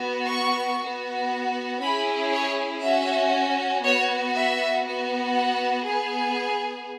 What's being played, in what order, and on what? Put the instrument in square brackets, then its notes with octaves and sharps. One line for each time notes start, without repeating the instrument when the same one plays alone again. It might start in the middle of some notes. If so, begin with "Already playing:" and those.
Already playing: [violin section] B3 F#4
C#6
B3 F#4
C#4 E4 G#4 B5
C#5
C#4 F#4 E5
B3 F#4 C#5
E5
B3 F#4
F#5
B3 G#4